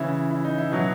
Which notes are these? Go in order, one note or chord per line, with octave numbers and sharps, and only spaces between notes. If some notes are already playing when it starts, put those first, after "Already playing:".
Already playing: C#3 E3 E4
E4
D#4
E4
B2 F#3 E4